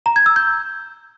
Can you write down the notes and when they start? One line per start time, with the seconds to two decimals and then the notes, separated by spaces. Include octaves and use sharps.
0.06 A#5
0.16 G#6
0.26 E6
0.36 G6